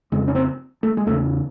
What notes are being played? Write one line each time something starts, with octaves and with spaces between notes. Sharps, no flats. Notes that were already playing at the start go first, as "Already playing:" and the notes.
F2 C#3 G#3
C#4
C4
A3
G#3
E2 C#3 A3